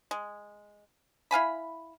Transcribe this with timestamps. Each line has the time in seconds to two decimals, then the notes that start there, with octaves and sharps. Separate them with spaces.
0.11 G#3
1.31 E4 F5 G#5 B5